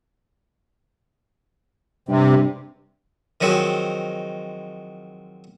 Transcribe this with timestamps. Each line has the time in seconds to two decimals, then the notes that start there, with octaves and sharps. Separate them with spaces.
2.09 G2 C3
3.41 D#3 F3 F#3 G#3 C4